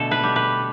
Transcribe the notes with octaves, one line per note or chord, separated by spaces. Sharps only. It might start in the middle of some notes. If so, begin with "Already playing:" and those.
Already playing: B2 D3 A3 A4
B4
G3
B4